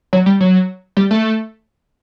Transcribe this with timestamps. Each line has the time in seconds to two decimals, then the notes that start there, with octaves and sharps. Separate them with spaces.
0.13 F#3
0.26 G3
0.40 F#3
0.97 G3
1.11 A3